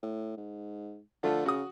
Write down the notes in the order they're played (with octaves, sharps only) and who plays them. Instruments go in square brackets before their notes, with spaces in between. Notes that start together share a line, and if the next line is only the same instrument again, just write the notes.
[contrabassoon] A2
G#2
[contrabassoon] D3 [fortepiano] F3 A3 F4
[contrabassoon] C#3 [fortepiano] F#4 D#6